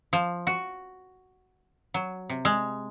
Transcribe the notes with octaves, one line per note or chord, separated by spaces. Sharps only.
F3
F#4
F#3
C3
G#3